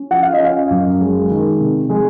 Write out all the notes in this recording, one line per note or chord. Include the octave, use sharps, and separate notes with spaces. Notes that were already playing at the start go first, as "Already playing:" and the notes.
Already playing: C#4
F3 F#5
F5
D#5
C#4 F5
F#2
G#3
D#3
C3
G#3